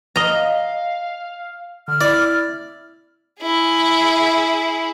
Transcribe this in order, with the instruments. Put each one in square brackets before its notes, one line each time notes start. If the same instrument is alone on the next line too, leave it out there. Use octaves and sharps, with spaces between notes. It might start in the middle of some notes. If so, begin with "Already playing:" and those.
[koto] D#5 A#5 [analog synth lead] F5
[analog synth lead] D3 [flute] F6
[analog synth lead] E4 [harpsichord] D5
[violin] E4 G#4